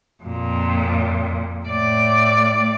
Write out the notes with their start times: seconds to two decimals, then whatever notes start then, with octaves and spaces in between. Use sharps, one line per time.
0.23 F2 A#2
1.67 A2 D5